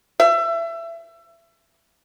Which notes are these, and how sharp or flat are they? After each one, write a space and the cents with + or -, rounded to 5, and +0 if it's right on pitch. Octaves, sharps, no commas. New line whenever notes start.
E5 +25